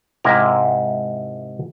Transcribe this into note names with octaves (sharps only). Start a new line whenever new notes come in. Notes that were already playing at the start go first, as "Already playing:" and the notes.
G#2 C3 E4 A#4